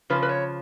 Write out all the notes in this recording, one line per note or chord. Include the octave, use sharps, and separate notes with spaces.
C#3 F3 B4
B4
C#5